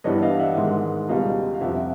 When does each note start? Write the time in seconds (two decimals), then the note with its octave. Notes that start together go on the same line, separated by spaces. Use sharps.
0.04 G2 E3 G3 B3 D4 C#5 D#5
0.22 D#5 F5
0.39 E5 F#5
0.57 G#2 D#3 G#3
1.08 C#2 B2 G3 D#5 F5
1.54 F5
1.61 F2 C3 F3 E5 F#5